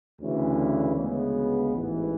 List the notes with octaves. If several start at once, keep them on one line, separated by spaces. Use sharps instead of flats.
D2 C#3 E3 A3 C#4
D2 C#3 G#3 B3
A1 G#2 E3